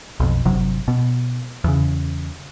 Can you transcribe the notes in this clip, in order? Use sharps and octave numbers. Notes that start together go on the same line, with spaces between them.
B1 F2
G1 C3 F#3
B2
E2 C#3